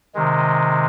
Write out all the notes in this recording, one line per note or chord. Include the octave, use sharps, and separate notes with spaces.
C3 D#3 G#3